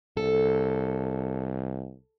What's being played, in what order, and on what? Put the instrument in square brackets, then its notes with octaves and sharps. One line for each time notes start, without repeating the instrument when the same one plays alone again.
[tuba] C2 [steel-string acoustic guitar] A4